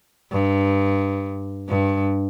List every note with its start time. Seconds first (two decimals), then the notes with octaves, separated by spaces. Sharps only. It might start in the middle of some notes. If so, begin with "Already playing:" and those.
0.31 G2
1.69 G2